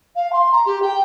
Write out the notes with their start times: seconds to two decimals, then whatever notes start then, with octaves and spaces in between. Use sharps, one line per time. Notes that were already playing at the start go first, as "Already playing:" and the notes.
0.16 F5
0.32 C6
0.52 A#5
0.66 G4
0.82 G5